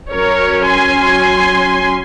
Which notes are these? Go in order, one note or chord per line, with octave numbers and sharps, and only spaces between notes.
F#3 C#4 A#4 C#5
G#5 C6